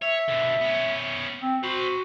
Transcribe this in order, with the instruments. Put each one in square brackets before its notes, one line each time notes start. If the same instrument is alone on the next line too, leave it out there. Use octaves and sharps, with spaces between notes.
[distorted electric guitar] C#5 [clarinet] E5
[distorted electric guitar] B2 D3
B3 C#4
[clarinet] C4
[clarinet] F#4 [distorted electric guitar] C5 B5